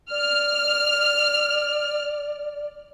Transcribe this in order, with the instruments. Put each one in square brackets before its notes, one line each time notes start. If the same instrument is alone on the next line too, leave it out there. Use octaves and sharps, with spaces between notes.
[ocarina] D5 [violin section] F6